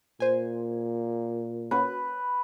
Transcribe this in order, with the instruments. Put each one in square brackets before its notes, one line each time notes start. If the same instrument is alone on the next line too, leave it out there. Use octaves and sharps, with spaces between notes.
[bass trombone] A#2 [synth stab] C5 G#5
[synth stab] A#3 C#4 F#4 [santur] B4